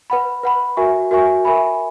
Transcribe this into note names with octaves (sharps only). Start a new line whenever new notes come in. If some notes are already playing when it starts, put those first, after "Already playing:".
B4 F#5 B5
B4 F#5 B5
F#4 A#4 E5 G#5 C#6
F#4 A#4 E5 G#5 C#6
A#4 E5 G#5 B5